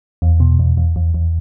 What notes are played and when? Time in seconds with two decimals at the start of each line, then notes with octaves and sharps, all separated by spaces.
0.22 E2
0.40 B2
0.59 E2
0.77 E2
0.96 E2
1.14 E2